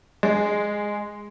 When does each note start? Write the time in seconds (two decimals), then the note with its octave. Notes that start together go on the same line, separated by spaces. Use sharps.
0.23 G#3